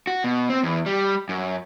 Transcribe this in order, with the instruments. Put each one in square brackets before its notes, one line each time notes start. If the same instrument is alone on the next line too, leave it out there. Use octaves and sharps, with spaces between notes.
[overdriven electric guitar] F#4
B2
C4
E2
G3
F#2